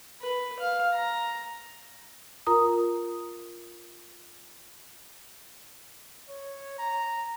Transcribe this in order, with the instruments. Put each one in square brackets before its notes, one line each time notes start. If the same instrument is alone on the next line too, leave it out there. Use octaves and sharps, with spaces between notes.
[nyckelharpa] B4
F5
A#5
[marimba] F4 A#4 A#5 D#6
[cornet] C#5
A#5